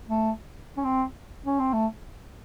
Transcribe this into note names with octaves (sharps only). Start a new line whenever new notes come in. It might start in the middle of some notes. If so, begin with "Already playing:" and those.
A3
C#4
C4
C#4
C4
A3